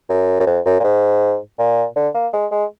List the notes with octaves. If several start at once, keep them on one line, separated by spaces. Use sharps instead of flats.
F#2
F#2
F2
F#2
A#2
G#2
A#2
D3
A#3
G#3
G#3